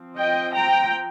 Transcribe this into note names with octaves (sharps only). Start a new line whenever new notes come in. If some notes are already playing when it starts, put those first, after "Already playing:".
Already playing: F3 C4
D#5 G5
G5 A#5